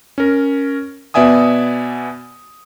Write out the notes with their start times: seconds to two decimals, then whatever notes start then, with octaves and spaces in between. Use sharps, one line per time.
0.18 C#4 A#4
1.14 B2 B3 D5 E5 G#5 D#6